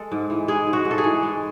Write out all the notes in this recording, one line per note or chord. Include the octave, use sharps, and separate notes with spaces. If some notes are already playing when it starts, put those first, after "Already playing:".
Already playing: G#3 A4
G#2
E3
G#3 G#4
G#2
F#4
G#2
A4
G#4
E3
G#3